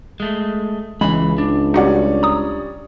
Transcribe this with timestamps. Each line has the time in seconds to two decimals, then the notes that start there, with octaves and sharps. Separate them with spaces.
0.20 G#3 A3
1.01 C#2 E3 G#3 C#4 B5
1.38 D4
1.74 G3 C#4 D#4 F#4 D5 F#5
2.23 A#5 D#6